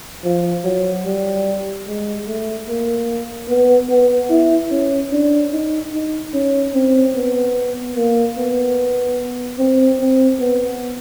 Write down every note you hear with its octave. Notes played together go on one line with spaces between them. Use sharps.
F3
F#3
G3
G#3
A3
A#3
B3
B3
E4
C#4
D4
D#4
D#4
C#4
C4
B3
A#3
B3
C4
C4
B3